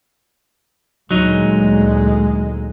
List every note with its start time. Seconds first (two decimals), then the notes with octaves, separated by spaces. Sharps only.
1.11 D2 A#2 F#3 G#3 D#4